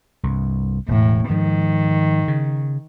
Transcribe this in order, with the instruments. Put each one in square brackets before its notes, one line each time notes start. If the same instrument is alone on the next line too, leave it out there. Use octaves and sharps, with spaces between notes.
[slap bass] C2 G2
[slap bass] E1 [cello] A2
[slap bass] G#2 F3 [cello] D#3
[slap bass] C#3